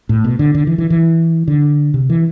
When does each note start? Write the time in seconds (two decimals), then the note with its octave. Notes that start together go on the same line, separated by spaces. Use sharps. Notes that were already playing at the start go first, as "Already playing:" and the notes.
0.09 A2
0.24 B2
0.39 D3
0.55 D3
0.67 E3
0.78 E3
0.90 E3
1.48 D3
1.94 C3
2.10 E3